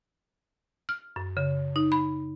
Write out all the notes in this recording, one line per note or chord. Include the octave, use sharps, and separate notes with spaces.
F6
F#2
C#3
D#4
B5